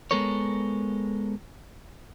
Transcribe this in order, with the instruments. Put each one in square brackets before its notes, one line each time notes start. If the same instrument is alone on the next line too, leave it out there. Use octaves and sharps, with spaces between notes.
[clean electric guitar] G#3 B3 A4 A#4 C#5